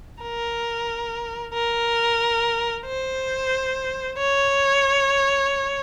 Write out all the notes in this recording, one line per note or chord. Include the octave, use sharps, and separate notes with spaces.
A#4
A#4
C5
C#5